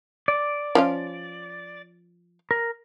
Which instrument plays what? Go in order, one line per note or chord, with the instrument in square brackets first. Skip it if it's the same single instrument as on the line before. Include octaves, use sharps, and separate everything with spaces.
[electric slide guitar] D5
[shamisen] F3 C#4 F4
[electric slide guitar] A#4